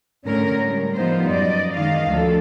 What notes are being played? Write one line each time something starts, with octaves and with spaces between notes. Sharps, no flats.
A2 D3 C#4 A#4
G3 G#3
F3 G3 B3 D#4 F4 C5
F#2 D5 D#5
D#3 E3 G#3 D#5 F5
D2 F3 D4 A4